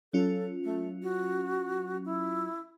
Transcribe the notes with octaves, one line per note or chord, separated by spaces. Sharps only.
F#3 C#4 F4 A4
A3
F#4
E4